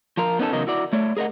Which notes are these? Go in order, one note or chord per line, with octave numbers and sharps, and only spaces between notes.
F3 F4 A#4
B3 C#4 D#4 G4 A4
E2 C#3 F#3 D#4 A#4 D#5
E4 F#4 D5
A3 C#5 D5
G#4 A#4 D5 D#5 F#5